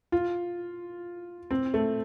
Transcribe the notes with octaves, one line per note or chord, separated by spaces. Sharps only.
F4
C4
A3